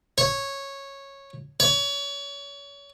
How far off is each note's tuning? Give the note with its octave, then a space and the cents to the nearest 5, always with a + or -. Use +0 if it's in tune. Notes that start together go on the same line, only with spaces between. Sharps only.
C#5 -10
C#5 +30